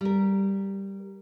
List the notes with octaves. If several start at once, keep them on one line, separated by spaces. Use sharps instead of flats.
G3 A#4